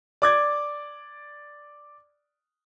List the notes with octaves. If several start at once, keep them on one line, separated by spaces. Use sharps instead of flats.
D5 D6 G#6